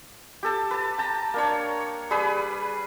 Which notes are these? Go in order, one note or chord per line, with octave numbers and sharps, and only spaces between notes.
G4 A4 A5
B4 A5
G5 A5 A#5
A#3 D4 C#5
G3 G#4 B4 B5